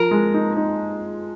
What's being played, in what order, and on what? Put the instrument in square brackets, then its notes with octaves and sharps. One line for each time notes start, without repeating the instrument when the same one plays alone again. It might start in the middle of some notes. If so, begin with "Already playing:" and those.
Already playing: [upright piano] F3 [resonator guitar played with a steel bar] A#4
[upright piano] G#3
D#4
D#4